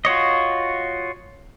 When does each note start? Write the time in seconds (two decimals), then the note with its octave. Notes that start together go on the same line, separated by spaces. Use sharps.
0.05 F4 F#4 C#5 D#5